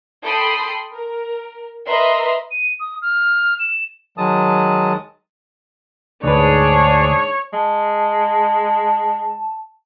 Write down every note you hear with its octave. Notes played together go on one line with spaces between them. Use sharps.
A4 G5 B5 C6 D#6 C7
A#4
A#4 B4 D#5 E5 A#5 C6
D#7
D#6
F6
E7
D#3 F#3 G#3 A5 D#6
D2 G#2 D4 G#4 B4 C#5
G#3 A5